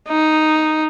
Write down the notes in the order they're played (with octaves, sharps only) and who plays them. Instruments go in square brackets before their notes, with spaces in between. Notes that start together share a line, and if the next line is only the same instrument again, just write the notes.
[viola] D#4